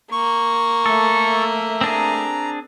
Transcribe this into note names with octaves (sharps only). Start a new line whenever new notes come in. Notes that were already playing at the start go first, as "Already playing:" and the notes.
A#3 C#6
A3 A4 E5
C4 D4 G#4 A#5